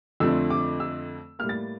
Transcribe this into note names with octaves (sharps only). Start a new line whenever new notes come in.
F2 D3 F3 A3 C4 E6
D6
E6
A2 G3 A#3 F6
A6